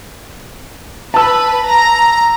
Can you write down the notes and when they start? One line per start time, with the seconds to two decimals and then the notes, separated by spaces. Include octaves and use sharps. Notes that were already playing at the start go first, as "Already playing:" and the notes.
1.14 B4 A5 E6
1.67 A#5